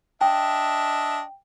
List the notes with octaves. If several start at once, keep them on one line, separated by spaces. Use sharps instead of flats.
D4 D#5 E5 G5